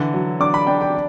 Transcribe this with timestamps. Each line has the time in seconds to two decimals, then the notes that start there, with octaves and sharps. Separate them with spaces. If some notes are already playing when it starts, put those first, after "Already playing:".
Already playing: D3 E3
0.14 F#3
0.40 D4 D6
0.54 B5
0.67 D4 G5
0.81 G5